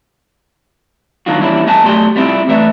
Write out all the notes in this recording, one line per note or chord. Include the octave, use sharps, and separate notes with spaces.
D#3 F#3 A#3 D4 F4 F#4
E3 G3 A#3 C#4 D4 E4
A#3 A#4 D#5 G#5 A5
B1 F#3 A3 G4 D5 C6
G3 B3 C4 E4 F4 D5
E3 A3 B4 D5 E5